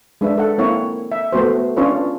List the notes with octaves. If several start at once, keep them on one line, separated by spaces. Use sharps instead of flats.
G#3 D4 B4 E5
A4 F#5
A#3 C4 E4 C#5 F#5
E5
A3 B3 F#4 C5
C#4 D4 F4 B4 C#5